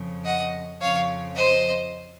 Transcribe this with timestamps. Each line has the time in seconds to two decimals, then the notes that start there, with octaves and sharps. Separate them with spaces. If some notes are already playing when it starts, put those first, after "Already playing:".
Already playing: F2 C#3 F3
0.25 D#5 F#5
0.80 F2 C#3 F3 C#5 F5
1.36 C5 D#5